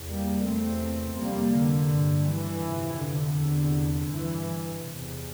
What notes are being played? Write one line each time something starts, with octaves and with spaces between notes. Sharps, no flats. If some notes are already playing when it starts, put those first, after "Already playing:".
Already playing: E2 C3
G3 A#3
E2 C3 A3 C4
F2 C3 G3 A#3
D3
G2
E3
F2 C3
D3
E2 C3
G2 E3
E2 C3